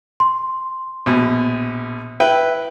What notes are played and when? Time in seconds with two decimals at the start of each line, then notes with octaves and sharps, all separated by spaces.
0.20 C6
1.06 A#1 B2
2.20 E4 B4 G5